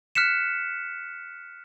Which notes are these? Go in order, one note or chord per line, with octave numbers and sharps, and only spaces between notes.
F6 F#6 B6 C#7 E7